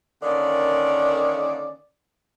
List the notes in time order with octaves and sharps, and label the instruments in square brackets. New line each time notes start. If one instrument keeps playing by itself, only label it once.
[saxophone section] D3 D#3 A#3 C#4 D5